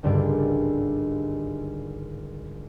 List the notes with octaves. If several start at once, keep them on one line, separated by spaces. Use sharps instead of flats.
G#1 C#2 G2 D3 G3 D7